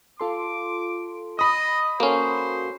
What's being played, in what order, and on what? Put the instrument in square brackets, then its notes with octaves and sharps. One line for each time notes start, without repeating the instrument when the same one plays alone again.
[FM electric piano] F4 A4 C6 [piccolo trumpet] D6
[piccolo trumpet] D#5 [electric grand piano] B5 D#6
[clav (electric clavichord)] A#3 C#4 [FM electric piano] F#4 A4 [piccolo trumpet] C5